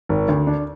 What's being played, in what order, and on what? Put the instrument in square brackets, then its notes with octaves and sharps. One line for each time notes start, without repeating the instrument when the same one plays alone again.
[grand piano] G#1
D2
D4